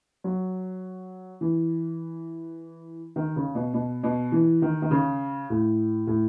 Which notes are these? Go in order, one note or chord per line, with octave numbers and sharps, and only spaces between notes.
F#3
E3
D#3
C#3
B2
B2
B2
E3
D#3
D#3
C#3
A2
A2